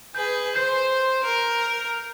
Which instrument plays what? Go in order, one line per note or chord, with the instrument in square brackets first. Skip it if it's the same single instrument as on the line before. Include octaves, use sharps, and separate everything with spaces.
[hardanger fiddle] G#4 B4 [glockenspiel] G6
[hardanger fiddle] C5 [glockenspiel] G6 C7
[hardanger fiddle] A#4